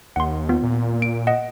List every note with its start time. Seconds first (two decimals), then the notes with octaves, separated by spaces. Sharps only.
0.16 D#2 F#5 C6
0.49 B3 F4
0.63 A#2
1.02 D7
1.27 D#5 F#5